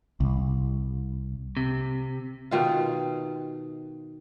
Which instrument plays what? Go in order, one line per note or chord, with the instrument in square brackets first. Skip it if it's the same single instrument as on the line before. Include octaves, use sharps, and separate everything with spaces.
[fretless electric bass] C2
[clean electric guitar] C3
[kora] B2 D#3 F4